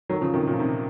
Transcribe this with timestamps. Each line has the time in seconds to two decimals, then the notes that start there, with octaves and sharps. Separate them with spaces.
0.09 D#3 F#3
0.21 C#3 F3
0.34 C3 D#3
0.47 A#2 C#3
0.54 F3
0.59 C3 D#3